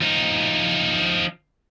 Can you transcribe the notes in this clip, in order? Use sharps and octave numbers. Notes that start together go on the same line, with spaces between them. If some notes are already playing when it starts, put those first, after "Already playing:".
F3 D#4